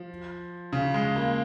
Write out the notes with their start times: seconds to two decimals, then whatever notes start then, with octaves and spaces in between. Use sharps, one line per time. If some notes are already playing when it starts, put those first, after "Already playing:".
Already playing: F3
0.73 C#3
0.94 G#3
1.16 A#3